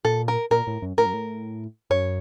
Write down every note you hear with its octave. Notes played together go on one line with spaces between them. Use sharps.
A#2 A4
A#4
A#2 A#4
A2
F#2
A2 A#4
F#2
A2
F#2 C#5